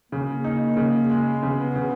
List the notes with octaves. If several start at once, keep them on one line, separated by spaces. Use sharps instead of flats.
C#3 A#3
D#4
C#3
G#3
C#3 B3
C#3